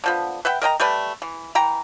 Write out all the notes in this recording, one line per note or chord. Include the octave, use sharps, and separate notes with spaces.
D3 F3 B3
B4 E5 F#5 G5
A#4 D#5 G5 A#5
G3 A3 B4 D5
E3
E3 G5 A#5